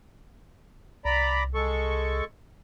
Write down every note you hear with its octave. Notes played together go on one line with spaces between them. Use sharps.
C2 D5 A#5 B5
G#3 A4 C#6